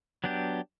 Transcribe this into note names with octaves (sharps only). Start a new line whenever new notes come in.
F#3 B3 D4 G4